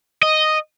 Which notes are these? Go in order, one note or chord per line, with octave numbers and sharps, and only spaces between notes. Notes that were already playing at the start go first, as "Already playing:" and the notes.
D#5